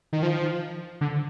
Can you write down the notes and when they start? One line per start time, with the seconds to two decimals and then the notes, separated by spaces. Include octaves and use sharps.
0.13 D#3
0.23 F3
1.01 D3